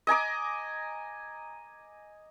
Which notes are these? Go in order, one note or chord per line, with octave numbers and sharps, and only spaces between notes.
D#5 G#5 A#5 D6